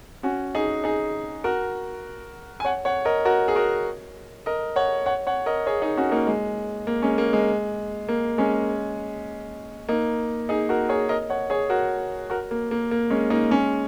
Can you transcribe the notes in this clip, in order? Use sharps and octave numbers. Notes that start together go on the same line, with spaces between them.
C#4 F#4
D#4 G#4
D#4 G#4
F#4 A#4
G#5
C#5 F#5
C#5 F#5
A#4 D#5
F#4 A#4
G#4
F#4 A#4
A#4 D#5
C#5 F#5
C#5 F#5
C#5 F#5
A#4 D#5
G#4 C#5
D#4 G#4
C#4 F#4
A#3 D#4
G#3
A#3
G#3 C#4
A#3
G#3
A#3
G#3 C#4
A#3 D#4
D#4 G#4
F#4 A#4
G#4 C#5
A#4 D#5
C#5 F#5
G#4 C#5
F#4 A#4
F#4 A#4
A#3
A#3
A#3
G#3 C#4
A#3 D#4
G#3 C#4